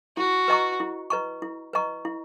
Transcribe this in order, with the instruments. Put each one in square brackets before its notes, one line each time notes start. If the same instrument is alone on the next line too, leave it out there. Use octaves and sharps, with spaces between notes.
[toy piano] E4 [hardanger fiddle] F#4
[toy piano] B4 D#5 A#5 C#6
E4
B4 D#5 A#5 C#6
E4
B4 D#5 A#5 C#6
E4